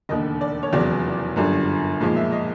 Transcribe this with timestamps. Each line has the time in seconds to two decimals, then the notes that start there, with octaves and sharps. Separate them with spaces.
0.09 E1 D#2 D3 D#5
0.41 D5
0.63 C#5
0.73 F1 E2 C#3 F#3 D5
1.36 G1 F#2 D3 G3
2.00 B1 A#2 F3 G#3
2.16 E5
2.32 D#5